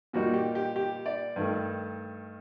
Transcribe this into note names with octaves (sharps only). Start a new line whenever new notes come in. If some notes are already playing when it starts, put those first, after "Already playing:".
A#2 G3 A#3 D#4 F#4
G4
G4
G4
D5
G2 D#3 A3